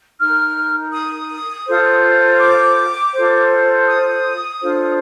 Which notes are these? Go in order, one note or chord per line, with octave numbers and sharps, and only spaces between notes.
D#4 A#4 F6
D#6
F4 A4 C5
D6
F4 A4 C5
D#6
D4 F4 A4 C5